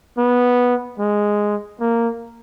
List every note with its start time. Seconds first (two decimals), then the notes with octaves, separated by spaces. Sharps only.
0.18 B3
0.99 G#3
1.81 A#3